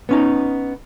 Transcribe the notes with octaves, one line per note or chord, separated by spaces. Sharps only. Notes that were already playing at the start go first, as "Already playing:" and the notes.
B3 C#4 D#4